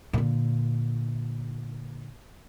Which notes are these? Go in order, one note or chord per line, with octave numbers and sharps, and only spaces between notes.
A#2 D3